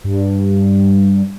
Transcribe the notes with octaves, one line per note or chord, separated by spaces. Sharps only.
G2